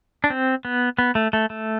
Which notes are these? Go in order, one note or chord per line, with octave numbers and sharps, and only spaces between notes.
D4
C4
B3
B3
A3
A3
A3